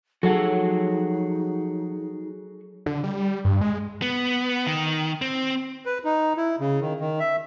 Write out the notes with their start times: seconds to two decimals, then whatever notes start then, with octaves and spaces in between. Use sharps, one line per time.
0.23 F3 F#3 D#4 F#4 G#4 A4 C#5 F#5
2.86 D3
3.04 G3
3.45 G2
3.61 G#3
4.02 B3
4.67 D#3
5.22 C4
5.86 B4
6.04 D#4
6.37 E4
6.60 C#3
6.81 D#3
7.00 D#3
7.20 E5